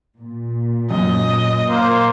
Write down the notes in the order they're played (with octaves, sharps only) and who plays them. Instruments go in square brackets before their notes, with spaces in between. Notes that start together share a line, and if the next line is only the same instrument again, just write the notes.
[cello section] A#2
[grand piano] F#2 [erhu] D#5
[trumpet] A#3 [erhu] C5